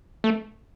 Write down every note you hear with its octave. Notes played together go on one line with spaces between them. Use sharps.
A3